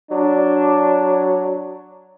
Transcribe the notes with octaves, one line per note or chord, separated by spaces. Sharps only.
F#3 D4